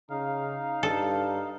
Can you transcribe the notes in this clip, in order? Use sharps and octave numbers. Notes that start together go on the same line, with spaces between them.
C#3 D#4 F5
G2 A4